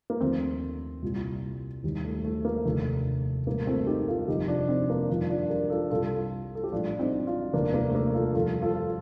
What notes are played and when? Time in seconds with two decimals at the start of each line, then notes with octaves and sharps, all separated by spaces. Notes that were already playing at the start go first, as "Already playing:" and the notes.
0.10 A#3
0.21 D#2 D3 F3 A3 C4
1.02 C2 A#2 G3
1.84 D#2 D#3 G3
2.05 A3
2.25 A3
2.45 A#3
2.65 F1 D#2 D3 A3
3.47 A1 A2 G3 A#3
3.67 A3 C4
3.87 D#4 G4
4.07 F4 A4
4.28 F1 F2 D3 G3 D#4 G4
4.48 D4 F4
4.69 C4 D#4
4.90 A#3 D4
5.09 G1 F2 D#3 D4 F4
5.29 D4 F4
5.50 G4 A#4
5.70 F4 A4
5.90 C2 C3 G3 F4 A4
6.55 A4
6.64 G4
6.72 A#1 A2 G3 D4 F4
6.99 C4 D#4
7.26 D4 F4
7.53 F1 D#2 D3 G3 A#3 D4
7.74 A#3
7.90 A3
7.95 A#3
8.14 F4 A4
8.35 F2 D#3 G3 F4 A4
8.62 F4 A4